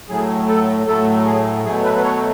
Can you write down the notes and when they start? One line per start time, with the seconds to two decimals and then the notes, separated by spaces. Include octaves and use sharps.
0.09 A2 F#3 A3 G#4
0.48 A4
0.87 A2 F#3 A3 A4
1.25 G#4
1.65 B2 F#3 A3 G#4
1.84 B4
1.97 B4
2.04 C#5